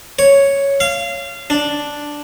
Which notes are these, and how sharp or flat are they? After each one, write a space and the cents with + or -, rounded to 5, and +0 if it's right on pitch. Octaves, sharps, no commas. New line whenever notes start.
C#5 +0
F5 -25
D4 +0